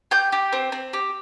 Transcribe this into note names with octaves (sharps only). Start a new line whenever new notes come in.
G4 G6
G4
C4
C4
G4